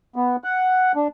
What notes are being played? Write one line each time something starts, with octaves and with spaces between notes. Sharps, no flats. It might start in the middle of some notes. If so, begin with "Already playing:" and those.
B3
F#5
D4